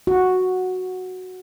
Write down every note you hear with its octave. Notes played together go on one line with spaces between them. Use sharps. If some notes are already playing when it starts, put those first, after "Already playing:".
F#4